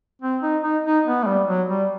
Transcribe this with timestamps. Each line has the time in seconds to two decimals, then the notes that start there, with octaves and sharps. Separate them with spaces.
0.22 C4
0.42 D#4
0.63 D#4
0.84 D#4
1.06 B3
1.23 A3
1.26 G3
1.47 F#3
1.69 G3